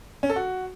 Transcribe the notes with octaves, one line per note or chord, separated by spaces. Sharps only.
C#4
A4
F#4